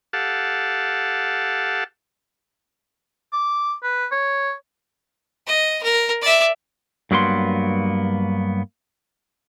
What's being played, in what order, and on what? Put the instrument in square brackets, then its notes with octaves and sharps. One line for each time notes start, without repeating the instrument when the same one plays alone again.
[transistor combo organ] G4 A4 F5 F#5 A5
[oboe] D6
B4
C#5
[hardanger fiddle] D#5
A#4
D5 E5
[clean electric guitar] G2 F#3 A#3 B3 C6